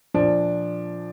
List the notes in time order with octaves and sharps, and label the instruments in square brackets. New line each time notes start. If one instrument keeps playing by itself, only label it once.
[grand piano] A#2 F3 D4